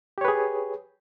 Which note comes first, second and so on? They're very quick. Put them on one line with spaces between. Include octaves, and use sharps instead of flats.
G4 C#5 B4 G#4